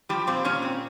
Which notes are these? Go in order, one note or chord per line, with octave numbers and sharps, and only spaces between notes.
F3 G3 G4
A#2 C4 C5
A#2 C#4 C#5
C4